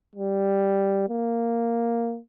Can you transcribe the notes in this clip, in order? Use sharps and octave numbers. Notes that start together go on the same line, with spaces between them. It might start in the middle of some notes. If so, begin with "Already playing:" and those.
G3
A#3